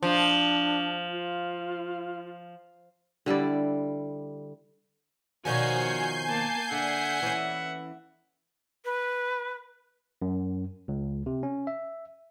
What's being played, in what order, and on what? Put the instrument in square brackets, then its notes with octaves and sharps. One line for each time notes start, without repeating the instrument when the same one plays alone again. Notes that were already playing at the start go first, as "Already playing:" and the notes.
[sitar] F3 [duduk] D4
[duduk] F4
[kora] D3 G3 E4 D5
[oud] B2 D#3 F3 [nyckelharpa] F#4 C#5 [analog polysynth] G#5 G6 C7
[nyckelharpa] A#3 A5
[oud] D3 [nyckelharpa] E5 F#5
[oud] E3 C#4
[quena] B4
[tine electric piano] F#2
C#2
C3
C#4
E5